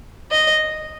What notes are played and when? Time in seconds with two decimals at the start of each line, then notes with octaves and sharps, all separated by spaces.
0.31 D#5